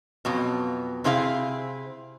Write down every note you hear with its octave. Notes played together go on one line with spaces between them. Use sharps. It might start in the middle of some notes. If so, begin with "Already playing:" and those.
F2 B2 F#3
C3 C4 E4 G#4 C5 F5